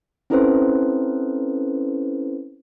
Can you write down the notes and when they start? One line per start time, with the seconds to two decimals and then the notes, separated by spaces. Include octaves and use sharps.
0.30 C4 C#4 E4 A4 B4 C5